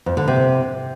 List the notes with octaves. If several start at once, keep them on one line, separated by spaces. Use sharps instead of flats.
F2
D3
C3